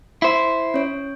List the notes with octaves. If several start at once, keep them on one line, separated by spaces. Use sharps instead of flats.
E4 C5
C#4 C#5